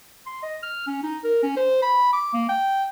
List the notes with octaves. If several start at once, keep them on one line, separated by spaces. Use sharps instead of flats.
C6
D#5
F6
C#4
D#4
A#4
C#4
C5
B5
D6
A#3
G5